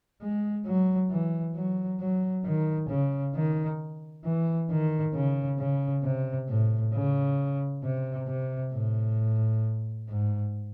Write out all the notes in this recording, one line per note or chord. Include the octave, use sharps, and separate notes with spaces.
G#3
F#3
E3
F#3
F#3
D#3
C#3
D#3
E3
D#3
C#3
C#3
C3
A2
C#3
C3
C3
A2
G#2